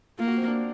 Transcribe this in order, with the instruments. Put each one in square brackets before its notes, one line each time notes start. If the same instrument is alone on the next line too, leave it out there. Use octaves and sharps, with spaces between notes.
[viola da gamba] A#3 [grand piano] F4
[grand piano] F#4
C4
D4